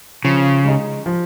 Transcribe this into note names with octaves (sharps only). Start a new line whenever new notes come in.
C#3 F3
G#3 D#4 G#4
F3